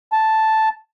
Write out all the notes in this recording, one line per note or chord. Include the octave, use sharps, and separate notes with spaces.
A5